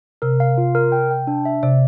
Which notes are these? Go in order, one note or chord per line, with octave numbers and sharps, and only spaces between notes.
C3 A#4
F5
F4
A#4
G5
G5
D4
E5
C3 D5